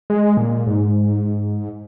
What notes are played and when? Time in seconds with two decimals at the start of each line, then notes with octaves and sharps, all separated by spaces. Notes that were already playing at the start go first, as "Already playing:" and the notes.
0.10 G#3
0.37 A#2
0.67 G#2